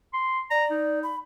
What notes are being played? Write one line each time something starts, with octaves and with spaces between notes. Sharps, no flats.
C6
D5 A#5
D#4
B5